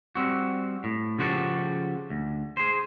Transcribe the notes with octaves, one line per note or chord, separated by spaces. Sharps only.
G3 C4 F#4
A2
C#3 F3 F#4 G4 A4
D2
G#4 C5